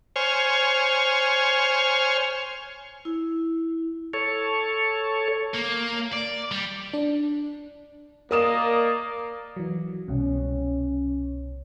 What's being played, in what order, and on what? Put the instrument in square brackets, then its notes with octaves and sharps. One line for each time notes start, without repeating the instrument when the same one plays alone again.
[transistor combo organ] C5 C#5 G#5 F6
[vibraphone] E4
[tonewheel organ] A4 C#5
[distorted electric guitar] A#3
D5
G3
[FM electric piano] D4
[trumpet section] A#3 D5 D#5 [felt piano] A#4 D#6 E7
[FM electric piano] E3 F#3
[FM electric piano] C2 B2 [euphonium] C#4